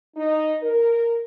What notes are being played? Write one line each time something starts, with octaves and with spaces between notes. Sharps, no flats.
D#4
A#4